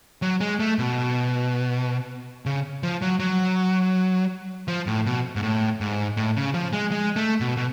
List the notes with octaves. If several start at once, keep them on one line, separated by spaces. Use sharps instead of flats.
F#3
G#3
A3
B2
C#3
F3
F#3
F#3
F3
A2
B2
G#2
A2
G#2
A2
C#3
F3
G#3
G#3
A3
B2
B2